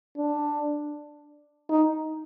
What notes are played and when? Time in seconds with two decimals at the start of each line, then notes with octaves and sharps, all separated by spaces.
0.18 D4
1.69 D#4